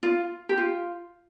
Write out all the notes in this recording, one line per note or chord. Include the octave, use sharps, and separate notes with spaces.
F4
G4
F4